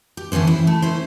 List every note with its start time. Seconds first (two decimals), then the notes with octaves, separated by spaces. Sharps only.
0.17 G4
0.32 D3 E3 B3 C#4 C5
0.47 E4
0.67 A3
0.82 C#4 E4 C5